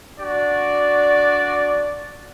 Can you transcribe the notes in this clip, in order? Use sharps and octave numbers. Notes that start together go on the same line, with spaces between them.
D4 F#4 D5